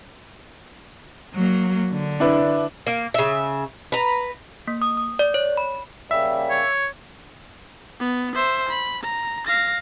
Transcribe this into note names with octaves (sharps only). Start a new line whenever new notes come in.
F#3 A#3
D3
D4 E4 B4
A#3
C#3 E5
B4 A#5
A#3
D#6
D#6
D5
C#5
B5
C#3 G3 A#3 E5
C#5
B3
C5 E5
B5
A#5
F5 A#6